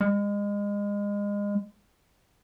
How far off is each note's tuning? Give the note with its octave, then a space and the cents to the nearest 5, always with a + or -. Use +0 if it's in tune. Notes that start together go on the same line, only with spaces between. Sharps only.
G#3 -30